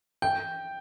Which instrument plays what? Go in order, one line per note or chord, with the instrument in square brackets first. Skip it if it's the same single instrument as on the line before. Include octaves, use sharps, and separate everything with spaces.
[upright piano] G5 [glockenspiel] G6